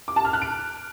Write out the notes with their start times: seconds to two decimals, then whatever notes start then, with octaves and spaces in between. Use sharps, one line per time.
0.08 D6
0.16 A5
0.25 F6
0.33 F#6
0.42 D7